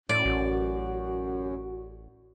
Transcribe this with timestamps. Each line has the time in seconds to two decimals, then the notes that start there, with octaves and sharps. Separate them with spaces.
0.09 F#2 A2 D5
0.25 A1 F#4